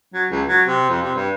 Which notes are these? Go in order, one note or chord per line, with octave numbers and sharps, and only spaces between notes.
F#3
C#2
F#3
C3
F2
C3
G2